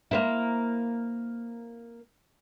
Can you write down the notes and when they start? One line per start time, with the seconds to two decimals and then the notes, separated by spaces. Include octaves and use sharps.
0.11 A#3 C4 E4